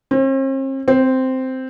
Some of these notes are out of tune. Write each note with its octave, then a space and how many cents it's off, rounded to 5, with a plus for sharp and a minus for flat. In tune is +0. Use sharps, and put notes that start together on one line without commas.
C4 +45
C4 -5